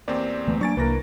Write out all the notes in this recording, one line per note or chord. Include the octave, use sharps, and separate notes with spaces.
E2 A#3 C4 G4 D5
D2 E3 A3 B3
F#3 A#3 D4 G#5 C#6 A6 D7
C2 E3 A#3 D4 A#4 B4 A#6